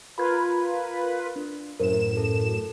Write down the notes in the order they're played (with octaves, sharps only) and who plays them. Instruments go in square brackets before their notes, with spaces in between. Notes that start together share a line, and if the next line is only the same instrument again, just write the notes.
[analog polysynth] F4 A#4 B4 [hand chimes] B5 G#6
[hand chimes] D4
[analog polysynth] F#2 A2 E7 [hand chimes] A#4 C5
[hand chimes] A4